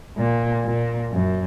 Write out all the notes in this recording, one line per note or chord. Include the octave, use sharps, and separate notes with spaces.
A#2
A#2
F#2